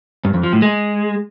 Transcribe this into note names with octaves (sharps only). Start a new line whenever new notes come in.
G2
F2
F3
A2
G#3